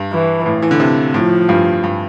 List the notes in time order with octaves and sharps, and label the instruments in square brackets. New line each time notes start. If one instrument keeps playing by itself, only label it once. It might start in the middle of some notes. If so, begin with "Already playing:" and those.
Already playing: [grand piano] G2
[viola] E3
[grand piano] A2
E3
D3
C3
[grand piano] A2 [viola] F3
[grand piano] G2
G2